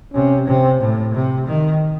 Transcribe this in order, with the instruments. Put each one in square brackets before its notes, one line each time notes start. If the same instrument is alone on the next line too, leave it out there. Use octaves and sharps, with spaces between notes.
[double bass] C3 [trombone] C#4
[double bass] C3 [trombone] C4
[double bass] A2
C3
D#3